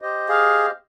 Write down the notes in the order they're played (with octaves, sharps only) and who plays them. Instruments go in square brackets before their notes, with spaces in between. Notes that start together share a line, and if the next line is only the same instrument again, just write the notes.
[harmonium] G4 C5 D#5
[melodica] G#4 [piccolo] F5